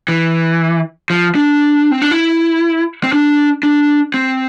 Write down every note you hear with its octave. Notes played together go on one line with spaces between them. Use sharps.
E3
F3
D4
C4
D4
E4
C4
D4
D4
C4